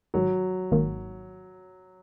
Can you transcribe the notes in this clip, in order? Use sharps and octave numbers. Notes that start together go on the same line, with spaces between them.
G#1 G#2 D#3 F#3
G#1 G#2 D#3 A#3